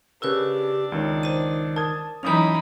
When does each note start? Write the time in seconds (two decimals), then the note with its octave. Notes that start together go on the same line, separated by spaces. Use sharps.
0.22 C#3 D4 G4 A#4 B4 E6 F#6
0.92 C#2 D#3 C#5
1.23 C5 D#7
1.76 A#4 A5 D#6 G#6
2.23 E3 F#3 C#4 D#4 B5 D#6 G6 F7